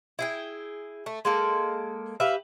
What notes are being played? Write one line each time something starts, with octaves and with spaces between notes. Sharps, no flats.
E4 G#4 G5
A3
G#3 A#3 A4
G4 B4 E5 F5